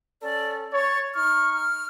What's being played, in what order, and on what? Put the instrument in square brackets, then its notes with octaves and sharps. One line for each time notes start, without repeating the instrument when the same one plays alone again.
[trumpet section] C#4 A4 [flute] D5
[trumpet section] C#5 [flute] A6
[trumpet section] D#4 C#6 [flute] F6
[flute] F6